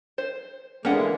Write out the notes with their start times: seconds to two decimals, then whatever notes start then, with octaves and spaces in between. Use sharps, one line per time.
0.18 C5
0.85 D3 E3 G#3 A#3 C#4 D4 F#5